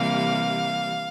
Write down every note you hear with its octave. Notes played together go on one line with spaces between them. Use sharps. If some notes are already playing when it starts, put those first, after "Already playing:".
Already playing: C3 E3 G3 A#3 F5